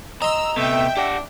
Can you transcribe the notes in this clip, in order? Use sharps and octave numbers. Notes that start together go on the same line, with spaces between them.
D#5 A#5 C6 E6
C3 A3 B3 E5 G5
D4 G4 F#5